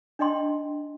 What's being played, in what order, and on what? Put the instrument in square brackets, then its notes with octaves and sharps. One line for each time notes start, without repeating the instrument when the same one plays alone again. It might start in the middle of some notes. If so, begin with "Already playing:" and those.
[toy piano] D4 D#4 D#5 G5 C6